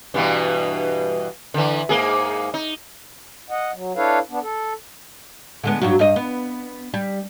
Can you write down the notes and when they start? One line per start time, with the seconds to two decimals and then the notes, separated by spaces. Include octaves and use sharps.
0.14 G2 B2 E3
1.54 D3 E3
1.89 G#2 A#3 G#4
2.54 D#4
3.50 D#5 F#5
3.74 F#3
3.96 D4 E4 A4 B4 C#5 F5
4.30 B3 D4
4.42 A4
5.64 D3 G#3 B3
5.81 G2 F#3 F#4
5.99 G2 D#5
6.16 B3
6.94 G3